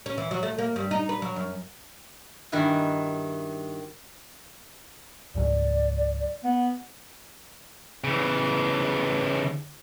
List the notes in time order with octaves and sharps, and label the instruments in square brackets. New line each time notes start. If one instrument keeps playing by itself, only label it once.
[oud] C#4
E3
F#3
A3
A#3
G2
D#4
B4
F#3
F#2
[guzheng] G2 D#3 E4 F#4 G#5
[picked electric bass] C#2 G#2 F#3 [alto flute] D5
[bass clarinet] B3
[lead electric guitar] C#3 E3